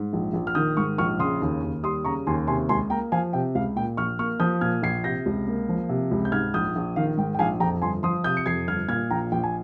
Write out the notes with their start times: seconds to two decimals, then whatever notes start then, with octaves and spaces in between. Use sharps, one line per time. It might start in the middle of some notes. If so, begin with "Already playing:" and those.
Already playing: G#2
0.13 A#1
0.34 A#1
0.47 F6
0.55 D#3 D#6 G6
0.77 G#2 C#6 F6
0.98 A#1 C#6 F6
1.19 C#3 C6 D#6
1.42 D#2
1.63 D#2
1.83 G3 C6 D#6
2.05 C#3 A#5 C#6
2.27 D#2 G#5 C6
2.47 C3 G#5 C6
2.69 C#2 G#5 C6
2.90 A#3 G5 A#5
3.12 F3 F5 G#5
3.33 C3 G5
3.55 C#2 F5
3.76 A#2 G5
3.97 A#1 C#6 F6
4.19 A#3 C#6 F6
4.40 F3 D#6 G6
4.61 A#2 F6 G#6
4.82 A#1 G#6 C7
5.04 C3 G6 A#6
5.26 C#2
5.47 A#3
5.69 F3
5.89 C3
6.11 C#2
6.25 G6
6.32 G#2 F6 G#6
6.54 A#1 D#6 G6
6.76 A#1
6.96 D#3 F5
7.17 G#2 G5
7.35 G5
7.39 A#1 F5 G#5
7.60 F2 G5 A#5
7.82 G1 G#5 C6
8.03 F3 C6 D#6
8.24 C3 D#6 G6
8.37 C#7
8.46 F2 G#6 C7
8.68 G1 F6 G#6
8.88 A#2 F6 G#6
9.10 A#1 G5 A#5
9.32 A#1 G5
9.44 G#5